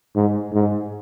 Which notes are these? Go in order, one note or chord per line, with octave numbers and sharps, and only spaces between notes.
G#2
G#2